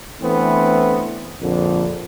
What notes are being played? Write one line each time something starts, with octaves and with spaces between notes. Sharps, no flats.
E3 A3 B3 C4 D4
A#1 F2 D3